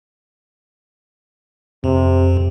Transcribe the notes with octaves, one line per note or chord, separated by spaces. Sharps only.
F2 C3